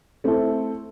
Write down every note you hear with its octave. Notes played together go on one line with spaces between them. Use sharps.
A3 C4 E4 A4